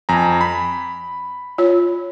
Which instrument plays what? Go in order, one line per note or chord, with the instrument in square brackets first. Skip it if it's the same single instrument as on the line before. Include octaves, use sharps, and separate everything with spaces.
[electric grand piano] F2 G#5 A#5
B5
[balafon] F4 C#5